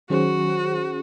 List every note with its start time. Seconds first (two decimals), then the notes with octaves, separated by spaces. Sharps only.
0.10 D#3 F#3 C#4 F#4 G#4 C5